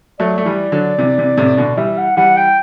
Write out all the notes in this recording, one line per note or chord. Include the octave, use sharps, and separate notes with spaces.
F#3 A3 D5
A3
E3 G3
D3 F#3
C3 E3
C3 E3
A2 C3
B2 D3
E3 G3 E5
F#5
E3 G3 F#5
G5